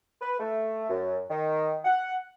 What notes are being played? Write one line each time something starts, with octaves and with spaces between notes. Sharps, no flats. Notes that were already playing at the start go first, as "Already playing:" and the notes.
B4
A3
F#2
D#3
F#5